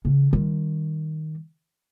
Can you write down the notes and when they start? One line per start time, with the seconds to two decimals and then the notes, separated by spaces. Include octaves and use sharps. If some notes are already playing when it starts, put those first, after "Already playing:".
0.05 C#3 E3
0.33 D#3 G3